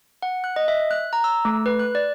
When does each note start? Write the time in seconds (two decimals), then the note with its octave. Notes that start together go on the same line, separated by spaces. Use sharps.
0.22 F#5
0.44 F#6
0.56 D#5
0.68 E5
0.91 F#6
1.13 A#5
1.24 E6
1.45 A3
1.66 B4
1.79 F#6
1.95 D5